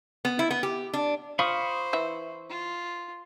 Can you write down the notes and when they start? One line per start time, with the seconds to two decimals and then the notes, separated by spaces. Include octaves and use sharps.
0.25 B3
0.39 E4
0.51 B3
0.63 G4
0.93 D4
1.39 F4 C5 B5 C#6 D#6
1.93 E3 E5
2.49 F4